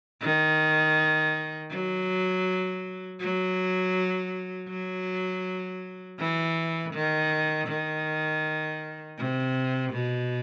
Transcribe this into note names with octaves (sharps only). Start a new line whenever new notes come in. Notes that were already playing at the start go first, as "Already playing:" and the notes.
D#3
F#3
F#3
F#3
E3
D#3
D#3
C3
B2